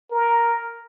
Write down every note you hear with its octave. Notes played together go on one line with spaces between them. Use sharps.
A#4